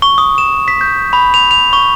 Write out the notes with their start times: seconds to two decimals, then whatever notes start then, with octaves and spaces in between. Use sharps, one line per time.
0.02 C#6
0.18 D#6
0.38 E7
0.68 B6
0.81 G6
1.13 B5
1.34 F7
1.51 F7
1.73 C#6